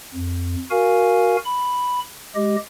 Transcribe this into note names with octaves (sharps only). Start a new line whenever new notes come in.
F2
F#4 A#4 F5 G#5
B5
G#3 G4 D#5